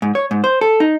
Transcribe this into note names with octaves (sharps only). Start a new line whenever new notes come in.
G#2
C#5
G#2
C5
A4
D#4